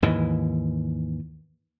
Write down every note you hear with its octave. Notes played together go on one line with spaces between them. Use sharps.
D#2 G#2 E3